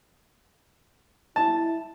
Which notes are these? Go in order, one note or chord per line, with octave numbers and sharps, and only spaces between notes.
E4 A5